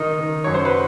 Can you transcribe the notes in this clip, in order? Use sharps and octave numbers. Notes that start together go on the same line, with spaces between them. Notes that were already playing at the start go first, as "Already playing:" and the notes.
Already playing: D#3 D#4
D#3
F#2 C#5
C5
B4